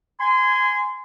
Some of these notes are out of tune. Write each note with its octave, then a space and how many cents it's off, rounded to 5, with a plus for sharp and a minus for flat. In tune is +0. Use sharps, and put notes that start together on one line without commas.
G#5 +0 C6 -30